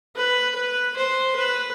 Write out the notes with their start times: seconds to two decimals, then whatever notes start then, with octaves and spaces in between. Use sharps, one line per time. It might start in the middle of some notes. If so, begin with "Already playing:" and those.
0.16 B4
0.56 B4
0.96 C5
1.36 B4